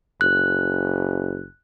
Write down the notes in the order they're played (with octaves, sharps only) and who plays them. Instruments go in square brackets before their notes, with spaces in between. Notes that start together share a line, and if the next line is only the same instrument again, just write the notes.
[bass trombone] F#1 [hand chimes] F#6